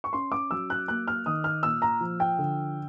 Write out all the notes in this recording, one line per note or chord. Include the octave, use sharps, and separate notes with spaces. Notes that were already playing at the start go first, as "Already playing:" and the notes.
C#6
C#4 C6
D6
F#3 E6
F#6
A#3 F#6
F6
D#3 D#6
F6
A#2 E6
A#5
F3
G5
D3